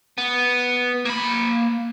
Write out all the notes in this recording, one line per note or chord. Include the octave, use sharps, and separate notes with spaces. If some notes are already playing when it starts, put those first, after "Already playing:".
B3
A#3 B5